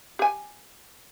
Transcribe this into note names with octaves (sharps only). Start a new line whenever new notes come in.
G4 G#5